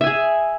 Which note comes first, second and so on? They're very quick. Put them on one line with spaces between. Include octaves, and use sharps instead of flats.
E5 G#5 G#4